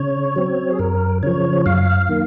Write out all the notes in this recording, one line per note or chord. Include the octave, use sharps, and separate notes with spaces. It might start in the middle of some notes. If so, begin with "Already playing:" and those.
Already playing: C#3 C#5
F#3 C4
G#4
F#2 A#4
C#3 F3 C#5
F#2 F5
D#3 A#3